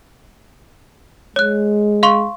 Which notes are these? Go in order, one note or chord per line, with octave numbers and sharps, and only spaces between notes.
G#3 C#5 F#6
F5 C6 C#6